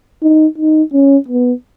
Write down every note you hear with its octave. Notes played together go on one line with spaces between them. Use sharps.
D#4
D#4
C#4
B3